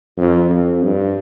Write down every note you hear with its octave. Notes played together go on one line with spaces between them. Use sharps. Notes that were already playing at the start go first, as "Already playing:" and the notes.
F2
F2
G2